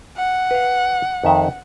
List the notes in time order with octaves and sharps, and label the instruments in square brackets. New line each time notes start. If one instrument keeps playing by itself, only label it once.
[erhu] F#5
[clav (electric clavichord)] B4 F5
F2 D#3 E5